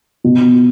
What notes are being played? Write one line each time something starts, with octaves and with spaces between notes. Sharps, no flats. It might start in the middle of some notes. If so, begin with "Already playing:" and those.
B2